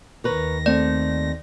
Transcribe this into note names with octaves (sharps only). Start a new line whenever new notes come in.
D#2 D#3 A#4 B4 C#5 A#6
A3 C4 D5